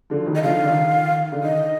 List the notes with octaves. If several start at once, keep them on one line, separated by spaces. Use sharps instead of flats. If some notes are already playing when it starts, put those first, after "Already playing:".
D3 F3
F3
D#3 G3
D#5
D3 F3 F5
D3
D#3
D3
D#3 D#5